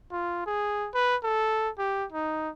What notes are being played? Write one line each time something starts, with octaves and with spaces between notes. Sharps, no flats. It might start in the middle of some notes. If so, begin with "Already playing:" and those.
F4
G#4
B4
A4
G4
D#4